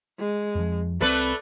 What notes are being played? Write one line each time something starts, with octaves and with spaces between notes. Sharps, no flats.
G#3
F2 F3
C2 G3 A3 C4 A4 B4 D5